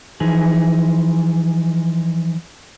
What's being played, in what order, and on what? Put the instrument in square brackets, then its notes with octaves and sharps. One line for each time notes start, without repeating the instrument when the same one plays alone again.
[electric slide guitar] E3 F3 D#4 G#4